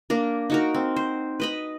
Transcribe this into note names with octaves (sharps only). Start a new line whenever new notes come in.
A#3 D4 A#4
D#4 F#4 A#4
C4
C5
B4 D#5 B5